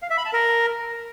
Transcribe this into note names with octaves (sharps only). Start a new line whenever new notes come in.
F5
E5
B5
A5
A#4